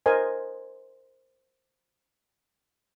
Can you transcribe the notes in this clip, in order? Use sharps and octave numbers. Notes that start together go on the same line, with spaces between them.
A#4 C5 D#5 G#5